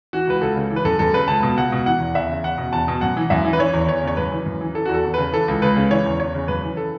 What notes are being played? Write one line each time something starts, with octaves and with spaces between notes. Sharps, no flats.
E3 F#4
C#2 B4
C#2 A4
C#3
E3
B4
F#2 A4
F#2 A4
C#3 B4
C#2 A5
B2
C#2 F#5
B2
E3 F#5
E2
E2 E5
C#3
E2 F#5
B2
E2 A5
B2
F#2 F#5
E3
F#2 E5
E3
B4
E3 C#5
E2
E2 C#5
C#3 C#5
F#2 B4
E3
F#2
E3
E3 A4
F#4
E2 A4
E2
C#3 B4
E3 A4
C#2
C#2 B4
C#3
E3 C#5
E2
E2 C#5
C#3
F#2 B4
E3
A4